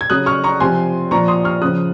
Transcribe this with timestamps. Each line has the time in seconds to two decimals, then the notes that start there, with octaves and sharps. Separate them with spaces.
0.01 G#6
0.10 C#3 F#3 D#6 F#6
0.26 C#6 F6
0.44 A#5 C#6
0.60 C3 F3 G#5 C6
1.11 A#2 F3 A#5 C#6
1.28 C6 D#6
1.44 C#6 F6
1.61 C#3 F3 D#6 F#6